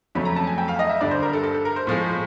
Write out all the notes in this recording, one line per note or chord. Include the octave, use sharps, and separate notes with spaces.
F2 C#3 F#3 A3 C#4 B5
A#5
A5
G#5
G5
F5
D#5
E5
G2 D3 G3 D5
C5
A#4
A4
A4
A4
A#4
C5
A2 F3 G#3